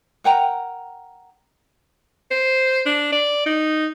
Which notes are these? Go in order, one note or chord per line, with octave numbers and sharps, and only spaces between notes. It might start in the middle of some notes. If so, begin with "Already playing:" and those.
A#4 F#5 G5 A#5
C5
D4
D5
D#4